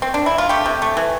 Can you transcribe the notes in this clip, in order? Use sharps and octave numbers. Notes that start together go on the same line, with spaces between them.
C4
D4
E4
F4
A3 G4
C3
A3
E3